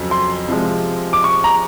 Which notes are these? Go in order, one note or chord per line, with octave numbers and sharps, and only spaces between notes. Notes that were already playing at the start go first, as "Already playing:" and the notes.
Already playing: F2 C#3 F#3
C6
C3 F3 G#3
D6
C#6
A#5